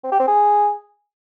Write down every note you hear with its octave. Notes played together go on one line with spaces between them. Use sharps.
C4
G4
C4
G#4